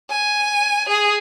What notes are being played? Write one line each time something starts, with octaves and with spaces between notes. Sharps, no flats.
G#5
G#4